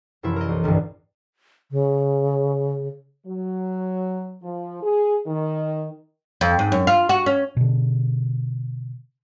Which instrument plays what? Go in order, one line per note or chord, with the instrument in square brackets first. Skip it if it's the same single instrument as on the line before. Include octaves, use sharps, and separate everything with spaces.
[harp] F#2 C3 E3 F3 E4
A#4 D#5
B1
C2 G2 D3 E3
[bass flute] C#3
[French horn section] F#3
F3
G#4
D#3
[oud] F2
G#2
F#2
F4
F#4
C#4
[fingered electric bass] B2 D3